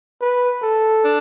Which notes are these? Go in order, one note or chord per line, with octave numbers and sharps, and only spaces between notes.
B4
A4
D4